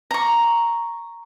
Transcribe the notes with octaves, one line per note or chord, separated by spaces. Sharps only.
A#5 C#6